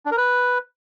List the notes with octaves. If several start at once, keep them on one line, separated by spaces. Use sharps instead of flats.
D4
A#4
B4